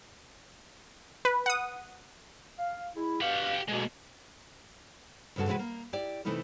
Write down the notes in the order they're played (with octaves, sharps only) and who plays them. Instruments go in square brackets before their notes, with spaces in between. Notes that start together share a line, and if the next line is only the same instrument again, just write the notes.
[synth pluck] B4
F#5 D#6
[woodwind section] F5
G#3 E4
[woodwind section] G2 B2 F5 [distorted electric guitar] G4 F#5
[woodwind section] D2 B2 [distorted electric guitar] G#3 A#3
[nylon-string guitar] D2 G2 C#3 F#4 A4
C3 E3 G#3 F#4 A#4 B4
A#3
E4 G4 D5
C3 E3 A3 D#4 E4 A#4